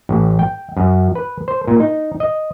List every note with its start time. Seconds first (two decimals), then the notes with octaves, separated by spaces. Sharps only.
0.09 A1
0.39 G5
0.77 F#2
1.15 B4
1.48 C5
1.67 A#2
1.80 D#4
2.20 D#5